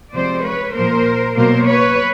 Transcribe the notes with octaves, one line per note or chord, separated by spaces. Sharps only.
C3 F3 G#3 C4 C5 D5
B4 C#5
A#2 F3 A#3 A#4 C5
B2 F#3 A#3 A#4 C5
B4 C#5